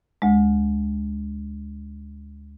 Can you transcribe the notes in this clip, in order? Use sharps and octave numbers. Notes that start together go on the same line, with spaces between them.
D2 G#3